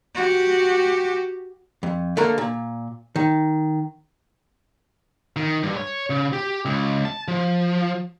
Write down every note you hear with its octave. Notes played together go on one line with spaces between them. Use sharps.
F#4 G4
F2
D3 A3 A#3 A#4
A#2
D#3
D#3
G2
C#5
C#3
G4
C#2
A5
F3